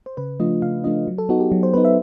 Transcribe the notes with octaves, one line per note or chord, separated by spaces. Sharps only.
C5
C#3 B4
F3 A3 D4 F4 D#5
C#3 F5
F3 A3 D4 F4 D#5
F#3
A4
B3 D#4 F#4
G4
F#3
C5
B3 D#4 B4
E5